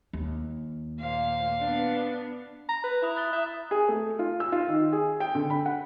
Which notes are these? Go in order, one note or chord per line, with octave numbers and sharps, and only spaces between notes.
D#2
A#2 C5 F5
B3 D4
A#5
B4 F#6
E4 A#5 B5 D#6
F#6 A6 G7
E5 D#6 G6
G#4
A3
F4
E6
F4
D#3
G#4
G5
D3
B5
F#5